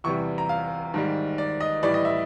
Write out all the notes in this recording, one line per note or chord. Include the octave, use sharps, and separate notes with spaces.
E2 C3 E3 G3 C#6
A#5
F5
G#2 D#3 G3
D5
D#5
A2 E3 G3 D5
D#5
E5